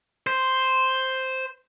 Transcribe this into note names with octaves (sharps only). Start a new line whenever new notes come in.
C5